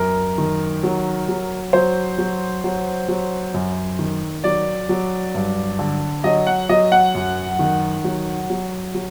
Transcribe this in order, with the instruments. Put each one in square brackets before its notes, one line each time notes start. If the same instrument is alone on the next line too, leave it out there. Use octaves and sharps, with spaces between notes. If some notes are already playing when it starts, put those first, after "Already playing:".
Already playing: [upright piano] F#2 A#4
D#3
F#3
F#3
F#3 C5
F#3
F#3
F#3
F#2
D#3
F#3 D5
F#3
G2
D3
F#3 D#5
F#5
F#3 D#5
F#5
F#2
D#3
F#3
F#3
F#3